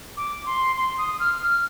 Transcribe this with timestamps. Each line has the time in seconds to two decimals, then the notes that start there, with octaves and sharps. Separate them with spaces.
0.17 D6
0.46 C6
0.76 C6
0.98 D#6
1.20 F6
1.42 F6